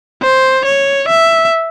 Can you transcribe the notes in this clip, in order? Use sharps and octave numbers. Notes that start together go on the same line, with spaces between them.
C5
C#5
E5